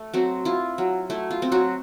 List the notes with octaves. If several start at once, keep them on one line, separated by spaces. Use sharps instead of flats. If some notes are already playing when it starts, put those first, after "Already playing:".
Already playing: A3
F#3 C4 F#4
E4 F4
F#3
A3 E4
F4
C4
F#3 F#4